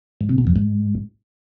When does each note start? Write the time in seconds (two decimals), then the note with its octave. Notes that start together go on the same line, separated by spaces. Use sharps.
0.21 G#2
0.29 C3
0.38 B2
0.47 F2
0.56 G#2